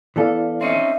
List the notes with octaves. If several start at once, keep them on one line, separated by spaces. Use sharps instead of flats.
E3 B3 E4 A4 D5 F5
C4 C#4 D#4 E5